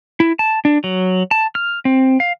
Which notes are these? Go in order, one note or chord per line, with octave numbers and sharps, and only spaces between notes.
E4
A5
D4
F#3
A5
F6
C4
F5